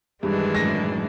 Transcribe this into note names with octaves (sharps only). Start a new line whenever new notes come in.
G2 D#3 E3 G#3 D4
F#2 A2 F#3 A#6